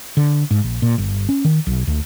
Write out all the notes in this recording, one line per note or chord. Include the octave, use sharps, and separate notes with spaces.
D3
G#2
A#1
A#2
G1
C#4
D#3
B1
D2